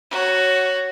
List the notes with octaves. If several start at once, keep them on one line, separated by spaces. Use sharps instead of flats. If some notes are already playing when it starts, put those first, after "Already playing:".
F#4 C#5